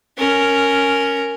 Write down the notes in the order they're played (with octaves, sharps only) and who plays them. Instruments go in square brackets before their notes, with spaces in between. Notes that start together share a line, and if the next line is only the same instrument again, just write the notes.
[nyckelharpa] C#4 A#4